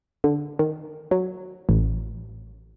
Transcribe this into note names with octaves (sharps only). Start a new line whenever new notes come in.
D3
D#3
F#3
A1